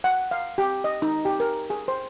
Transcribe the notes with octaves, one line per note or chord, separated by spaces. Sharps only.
F#5
F5
G4
D#5
D#4
G4
A#4
G#4
C5